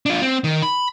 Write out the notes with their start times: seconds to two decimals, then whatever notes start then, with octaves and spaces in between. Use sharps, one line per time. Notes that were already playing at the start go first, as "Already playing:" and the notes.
0.06 D4 F4
0.22 C4
0.44 D#3
0.63 B5